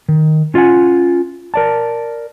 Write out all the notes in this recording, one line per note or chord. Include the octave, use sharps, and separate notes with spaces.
D#3
C#4 F4 C#5 F#5 G#5
A#4 D5 A5